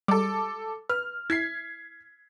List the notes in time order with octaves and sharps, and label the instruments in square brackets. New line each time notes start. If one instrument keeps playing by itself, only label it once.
[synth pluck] G3 G#3 [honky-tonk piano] A4 D6
[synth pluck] B4 [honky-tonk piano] F6
[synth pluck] E4 [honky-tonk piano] G#6 B6 C7